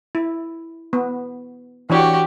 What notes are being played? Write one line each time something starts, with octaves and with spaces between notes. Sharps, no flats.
E4
B3
E3 D4 F#4 G4 C#5